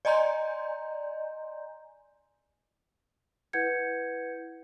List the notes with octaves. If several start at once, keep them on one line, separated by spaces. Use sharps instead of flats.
D5 D#5 G#5 A#5 C6 G6
E4 B4 F#5 G6 G#6 C#7